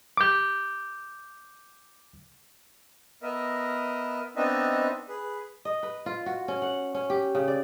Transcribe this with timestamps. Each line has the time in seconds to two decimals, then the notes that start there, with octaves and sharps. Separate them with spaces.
0.17 D6 G6
3.23 B3 A#4 D#5 E5
4.36 B3 C4 D4 D#4 D#5 E5
5.09 G#4 B4
5.65 D#5
5.83 B4
6.06 F4
6.26 F#4
6.48 C#4
6.62 F#5
6.95 C#4
7.10 G4
7.35 C#3
7.48 D5